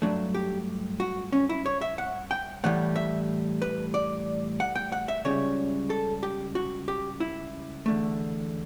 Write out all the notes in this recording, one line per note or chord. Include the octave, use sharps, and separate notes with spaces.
G2 F#3 A3 D4
G4
F#4
C#4
E4
C#5
E5
F#5
G5
A2 E3 G3 F#5
E5
B4
D5
F#5
G5
F#5
E5
C#2 C#3 G3 C#5
A4
G4
F#4
G4
E4
E2 D3 A3